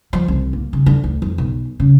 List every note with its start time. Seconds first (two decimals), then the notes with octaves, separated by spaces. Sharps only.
0.13 F3
0.28 C2
0.53 A#3
0.73 C#3
0.86 D3
1.04 D2
1.22 F2
1.38 B1
1.80 C#3